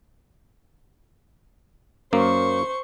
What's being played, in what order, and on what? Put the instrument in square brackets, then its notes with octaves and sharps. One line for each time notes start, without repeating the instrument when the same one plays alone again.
[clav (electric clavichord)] F#2 A#3 [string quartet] C5 C#6